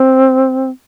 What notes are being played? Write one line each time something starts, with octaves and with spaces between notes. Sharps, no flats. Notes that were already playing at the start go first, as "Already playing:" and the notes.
Already playing: C4